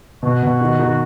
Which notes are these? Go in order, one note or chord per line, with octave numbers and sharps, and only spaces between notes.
B2 F#4
B2
D#3
D#3